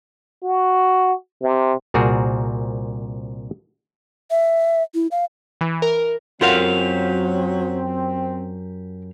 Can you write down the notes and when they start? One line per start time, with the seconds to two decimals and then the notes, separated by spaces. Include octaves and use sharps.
0.43 F#4
1.42 C3
1.94 C2 A#2 C4 F#4 G#4 A#4
4.31 E5
4.94 E4
5.11 F5
5.61 E3
5.82 A#4
6.41 F#2 F#3 C4 F4 G4 A#4 F5 F#5